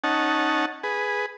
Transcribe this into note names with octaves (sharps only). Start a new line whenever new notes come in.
C#4 D#4 F#5 A5
G#4 B4